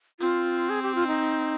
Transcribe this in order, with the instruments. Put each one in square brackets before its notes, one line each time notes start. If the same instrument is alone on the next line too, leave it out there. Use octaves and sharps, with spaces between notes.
[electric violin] C4 [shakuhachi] F4
[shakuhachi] G#4
G4
F4
D#4